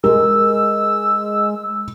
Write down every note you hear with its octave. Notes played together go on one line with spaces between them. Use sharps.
G#3 A#4 E6